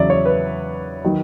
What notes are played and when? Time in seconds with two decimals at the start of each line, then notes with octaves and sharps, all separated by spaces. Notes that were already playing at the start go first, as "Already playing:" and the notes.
Already playing: E2 C#3 F#3 D5 E5
0.10 C#5
0.25 B4
1.04 D#3 F#3